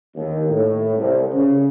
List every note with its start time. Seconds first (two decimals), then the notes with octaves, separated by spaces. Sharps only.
0.16 D#2
0.49 A2
0.97 C2
1.33 C#3